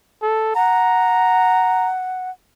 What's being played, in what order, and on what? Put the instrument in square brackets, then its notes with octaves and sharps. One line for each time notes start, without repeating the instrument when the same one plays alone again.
[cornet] A4
[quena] F#5 [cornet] A#5